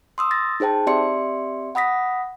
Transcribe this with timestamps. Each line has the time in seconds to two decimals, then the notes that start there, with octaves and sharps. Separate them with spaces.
0.18 C6 D#6 E6
0.31 A6 A#6
0.60 D#4 G#4 C5 G5 A5
0.87 C4 G4 D5 E5 C6 C#7
1.75 F#5 B5 D#6 A#6 B6